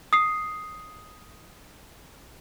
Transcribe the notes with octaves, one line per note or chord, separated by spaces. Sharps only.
D#6 C7